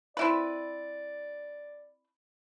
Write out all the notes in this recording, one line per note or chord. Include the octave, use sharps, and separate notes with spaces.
C4 E4 B4 D5